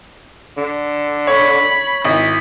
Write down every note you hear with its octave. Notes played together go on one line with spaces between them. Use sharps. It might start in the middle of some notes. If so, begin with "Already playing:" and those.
D3
C#5 B5
G#1 E4 B6